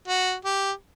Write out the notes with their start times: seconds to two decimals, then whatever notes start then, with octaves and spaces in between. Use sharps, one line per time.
0.08 F#4
0.45 G4